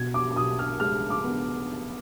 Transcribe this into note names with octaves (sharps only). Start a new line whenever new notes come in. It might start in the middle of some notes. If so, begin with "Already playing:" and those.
Already playing: B2 G#6
D6
D6
B1 D#6
F6
G#3 F6
D6
B3